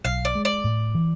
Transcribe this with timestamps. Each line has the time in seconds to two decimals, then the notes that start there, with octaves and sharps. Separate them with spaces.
0.05 B1 F5
0.25 D5
0.35 G#3
0.45 D5
0.64 A2
0.95 E3